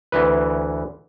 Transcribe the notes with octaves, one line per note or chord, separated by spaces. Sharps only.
D2 E3 B4